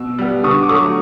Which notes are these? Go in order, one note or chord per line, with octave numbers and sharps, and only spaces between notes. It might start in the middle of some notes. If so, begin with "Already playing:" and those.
Already playing: B2 E6
G3 B3
D3 C#6 D#6
D6
F#3 A3 C#6 D#6